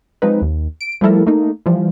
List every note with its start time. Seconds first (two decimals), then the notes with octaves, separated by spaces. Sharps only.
0.22 F3 G#3 C4 D#4 B4
0.42 D#2
0.81 D7
1.01 F3 G3 A3 E4 A4 A#4
1.26 A3 A#3 D#4
1.66 E3 F3 G3